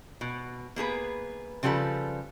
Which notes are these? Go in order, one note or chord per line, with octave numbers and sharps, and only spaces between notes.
B2
A#3 B3 G#4 B4
C#3 F3 G3 A4 B4